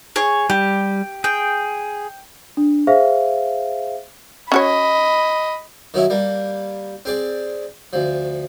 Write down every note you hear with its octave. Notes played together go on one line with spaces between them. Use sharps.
G#4 C#5
G3 G4
G#4 G5
D4
G#4 C5 E5 F5
C#4 F#4 C#5 D#5 B5
D#3 F#3 C#4 E4
G3 A#3
C4 G#4 D5
D2 F3